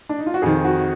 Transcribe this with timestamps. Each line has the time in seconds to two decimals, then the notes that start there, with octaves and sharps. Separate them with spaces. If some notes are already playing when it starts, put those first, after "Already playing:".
0.09 D4
0.19 D#4
0.26 F4
0.34 F#4
0.42 F2 D#3 G#4
0.65 F#4